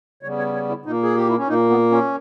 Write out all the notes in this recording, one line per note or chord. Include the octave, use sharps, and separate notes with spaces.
C#3 G3 B3 C#5
C#5
C#5
E4
A#2 A#3 D#4
G#4
G4
E4
C#4
A#2 A#3 D#4
B3
C#4